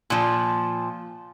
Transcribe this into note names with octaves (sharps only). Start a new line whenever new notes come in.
A#2 F3